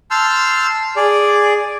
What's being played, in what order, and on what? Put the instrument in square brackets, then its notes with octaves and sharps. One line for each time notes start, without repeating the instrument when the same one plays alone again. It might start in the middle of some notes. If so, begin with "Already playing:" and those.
[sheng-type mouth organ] A5 C6 E6 F6 G6
G#4 D5